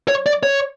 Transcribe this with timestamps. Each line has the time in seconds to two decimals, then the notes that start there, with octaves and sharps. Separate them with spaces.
0.08 C#5
0.26 D5
0.43 C#5